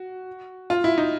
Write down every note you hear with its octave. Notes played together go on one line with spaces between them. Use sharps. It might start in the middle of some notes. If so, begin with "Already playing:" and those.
Already playing: F#4
F4
E4
D#4